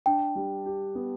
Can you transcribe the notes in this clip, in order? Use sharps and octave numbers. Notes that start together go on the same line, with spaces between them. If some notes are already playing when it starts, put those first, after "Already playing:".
D4 G5
G3
G4
B3